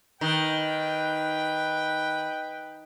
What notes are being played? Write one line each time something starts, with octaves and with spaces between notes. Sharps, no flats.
D#3 B4 G5